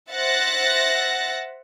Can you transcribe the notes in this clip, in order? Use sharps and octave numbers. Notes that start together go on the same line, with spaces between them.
C5 E5 F#5 F#6 A6 A#6